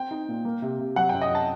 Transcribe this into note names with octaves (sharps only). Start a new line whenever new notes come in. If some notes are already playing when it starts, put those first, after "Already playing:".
Already playing: C4 G5
D#4
A#2
A#3
C3
C3
F#3 F#5
F#2 G5
D#5
F#2 A5